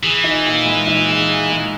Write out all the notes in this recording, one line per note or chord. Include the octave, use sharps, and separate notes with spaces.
E3 G#4
D#4
A#2
G#3
D#4
G#4
G#4
G#3